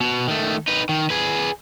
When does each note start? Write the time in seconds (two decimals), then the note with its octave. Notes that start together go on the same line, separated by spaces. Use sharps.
0.01 B2
0.28 D#3 A3
0.68 D#4 B4
0.89 D#3
1.10 G#4 B4